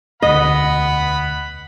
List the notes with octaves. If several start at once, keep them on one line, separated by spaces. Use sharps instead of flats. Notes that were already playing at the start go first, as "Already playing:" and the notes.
E1 D2 D#5 F#5 B5